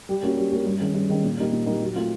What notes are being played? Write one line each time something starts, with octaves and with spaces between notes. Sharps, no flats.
G3
A#3 C#4 F#4
G3
A#3 C#4 F#4
G2
D#3 G#3 C#4
G2
D#3 G#3 C#4
A#2
G3 A#3 D#4
A#2
G3 A#3 D#4
F#3
A3 C4 F4